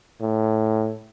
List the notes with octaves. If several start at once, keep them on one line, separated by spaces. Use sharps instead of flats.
A2